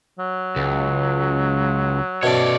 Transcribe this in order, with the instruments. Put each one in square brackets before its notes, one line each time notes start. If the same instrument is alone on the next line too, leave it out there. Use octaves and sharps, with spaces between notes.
[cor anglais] F#3
[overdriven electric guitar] C#2
[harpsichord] B2 A3 C#4 [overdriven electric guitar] C#5 D5